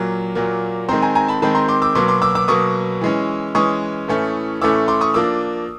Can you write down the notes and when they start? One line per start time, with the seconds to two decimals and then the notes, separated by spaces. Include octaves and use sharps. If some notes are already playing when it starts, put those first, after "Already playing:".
Already playing: A#2 F#3 A#3
0.35 A#2 F#3 A#3
0.89 D#3 G#3 C4 A#5 C6
1.02 G#5 A#5
1.15 G#5 A#5
1.28 A5 B5
1.42 D#3 G#3 C4 A5 B5
1.55 A#5 C6
1.68 C6 D6
1.82 D6 E6
1.95 B2 F#3 A#3 C6 D6
2.08 C6 D6
2.22 D6 E6
2.35 D6 E6
2.48 B2 F#3 A#3 C#6 D#6
3.01 E3 G#3 C#4
3.55 E3 G#3 C#4 C#6 D#6
4.08 A2 E3 A3 C#4
4.61 A2 E3 A3 C#4 D6 E6
4.88 C6 D6
5.01 C#6 D#6
5.14 F3 A#3 D4 D6 E6